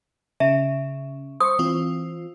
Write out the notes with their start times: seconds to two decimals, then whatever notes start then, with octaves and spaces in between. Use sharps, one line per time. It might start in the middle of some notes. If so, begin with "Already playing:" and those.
0.40 C#3 E5
1.40 C5 C#6 D#6
1.59 E3 C4 F4